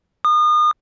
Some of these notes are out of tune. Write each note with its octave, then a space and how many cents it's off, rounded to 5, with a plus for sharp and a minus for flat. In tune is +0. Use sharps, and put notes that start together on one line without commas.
D#6 -35